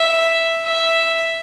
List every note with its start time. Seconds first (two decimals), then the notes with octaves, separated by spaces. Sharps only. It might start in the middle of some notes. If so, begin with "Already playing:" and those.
Already playing: E5
0.66 E5